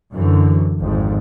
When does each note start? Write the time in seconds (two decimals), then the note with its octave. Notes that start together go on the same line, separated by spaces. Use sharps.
0.13 F#2 D3 E3
0.80 G#1 F2 G#2